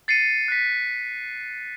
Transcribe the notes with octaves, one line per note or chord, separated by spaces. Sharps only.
A6 C7 C#7 D#7
F#6 B6